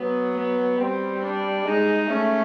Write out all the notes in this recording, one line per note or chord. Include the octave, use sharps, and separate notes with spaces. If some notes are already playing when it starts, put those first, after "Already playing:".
Already playing: F#3 B3
B3
G3 C4
D4
G#3 D#4
A3 C#4